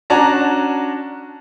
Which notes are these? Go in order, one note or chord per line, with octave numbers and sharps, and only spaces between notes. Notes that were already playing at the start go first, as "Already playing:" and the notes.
C#4 D4 F#4 A5 A#5